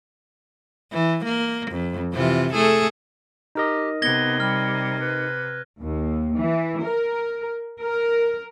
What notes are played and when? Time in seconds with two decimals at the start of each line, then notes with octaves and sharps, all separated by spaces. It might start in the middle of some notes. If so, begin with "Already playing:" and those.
0.92 E3
1.25 A#3
1.71 F2
2.13 C3 E3 F4
2.53 A3 G#4 A4
3.55 D#4 G4 A#4 D#5
4.02 C3 B3 G#6 A#6 G7
4.40 G3 F6
4.99 B4
5.81 D#2
6.37 E3
6.82 A#4
7.80 A#4